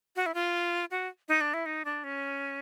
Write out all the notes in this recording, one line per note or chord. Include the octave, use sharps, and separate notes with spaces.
F#4
E4
F4
F#4
D#4
D4
E4
D#4
D4
C#4